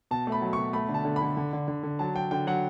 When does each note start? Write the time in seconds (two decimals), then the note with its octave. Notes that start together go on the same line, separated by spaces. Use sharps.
0.11 B2 A5
0.27 A3
0.32 B5
0.42 F#3
0.53 B2 C#6
0.73 A3 B5
0.89 D3
0.94 A5
1.05 D3
1.16 B5
1.22 D3
1.37 D3
1.53 D3
1.68 D3
1.83 D3
1.99 F#3 A5
2.15 F#3 G5
2.31 D3 G5
2.47 F#3 F#5